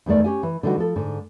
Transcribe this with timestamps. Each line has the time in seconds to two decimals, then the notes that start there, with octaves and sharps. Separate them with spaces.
0.06 E2 D#3 G#3 A3 D5
0.24 C#4 G4 G#5
0.43 E3
0.63 D3 E3 G3 D#4 F#4
0.78 F3 A4
0.96 G#2 D3